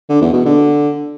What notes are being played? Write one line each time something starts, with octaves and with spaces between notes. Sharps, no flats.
D3
E2
B2
D3